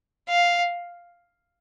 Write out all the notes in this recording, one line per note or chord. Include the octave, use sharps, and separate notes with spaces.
F5